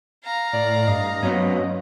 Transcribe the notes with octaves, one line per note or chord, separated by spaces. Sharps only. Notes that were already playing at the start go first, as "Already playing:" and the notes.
F5 A#5
A2 D5
G2 D#5
F#3 B3 C#4